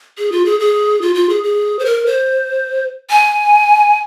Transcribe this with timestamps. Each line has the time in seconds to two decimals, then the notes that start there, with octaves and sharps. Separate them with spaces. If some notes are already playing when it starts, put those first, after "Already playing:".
0.18 G#4
0.32 F4
0.45 G#4
0.60 G#4
1.01 F4
1.15 F4
1.29 G#4
1.44 G#4
1.79 C5
1.85 A#4
2.06 C5
3.10 G#5